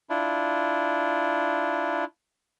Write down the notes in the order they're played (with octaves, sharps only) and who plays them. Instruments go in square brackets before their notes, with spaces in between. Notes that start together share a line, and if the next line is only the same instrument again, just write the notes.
[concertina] D4 E4 F4